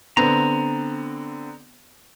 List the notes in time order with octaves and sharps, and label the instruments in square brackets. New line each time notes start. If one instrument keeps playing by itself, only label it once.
[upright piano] D3 B3 C4 [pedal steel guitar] A#5